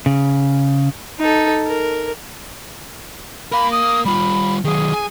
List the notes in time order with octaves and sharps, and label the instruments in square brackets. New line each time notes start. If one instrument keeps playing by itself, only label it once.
[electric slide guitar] C#3
[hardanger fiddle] D#4 A4
A#4
[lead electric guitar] A#4 F5 [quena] B5
[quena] D#6
[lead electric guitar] G3 F4 [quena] B5
[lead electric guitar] D#3 F#3 [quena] G#4
[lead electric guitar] G#5